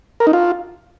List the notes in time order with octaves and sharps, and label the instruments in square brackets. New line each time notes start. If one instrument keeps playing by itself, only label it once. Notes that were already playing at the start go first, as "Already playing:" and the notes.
[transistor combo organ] A#4
D#4
F4